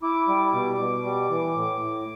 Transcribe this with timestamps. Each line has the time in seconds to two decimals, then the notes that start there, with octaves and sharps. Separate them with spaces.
0.03 E4 D6
0.28 G3
0.53 B2
0.78 B2
1.04 G3
1.29 E3
1.54 A2
1.80 A2